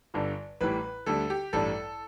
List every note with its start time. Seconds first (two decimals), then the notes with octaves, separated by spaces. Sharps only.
0.14 G1 G2 D3 G3
0.61 A1 A2 E3 G3 B4
1.06 D2 D3 G3 A4
1.30 G4
1.53 A1 G2 G3 A4